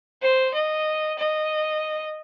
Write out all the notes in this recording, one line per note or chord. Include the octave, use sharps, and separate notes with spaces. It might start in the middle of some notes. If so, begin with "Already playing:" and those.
C5
D#5
D#5